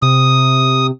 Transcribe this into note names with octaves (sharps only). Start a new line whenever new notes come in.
C3 D#6